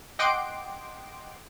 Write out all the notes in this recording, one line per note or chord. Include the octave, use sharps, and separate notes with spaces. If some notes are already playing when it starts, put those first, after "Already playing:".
D#5 F#5 G5 C6 D6 D7